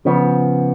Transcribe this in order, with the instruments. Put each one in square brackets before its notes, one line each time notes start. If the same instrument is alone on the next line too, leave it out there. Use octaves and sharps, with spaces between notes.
[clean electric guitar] C#3 F3 B3